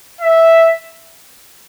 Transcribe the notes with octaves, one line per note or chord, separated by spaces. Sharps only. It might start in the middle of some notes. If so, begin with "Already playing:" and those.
E5